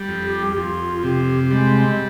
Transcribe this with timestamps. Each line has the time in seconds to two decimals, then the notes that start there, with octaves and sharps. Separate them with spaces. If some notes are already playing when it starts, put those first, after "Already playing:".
Already playing: G3
0.09 F2
0.24 G4
0.56 F2 F4
1.03 C3 G4
1.50 G3 G#3